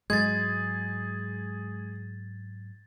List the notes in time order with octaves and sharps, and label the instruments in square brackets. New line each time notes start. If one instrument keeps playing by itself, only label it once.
[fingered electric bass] G#2 F#3 [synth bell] G#3 [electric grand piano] G#4 [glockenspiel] G#6 A6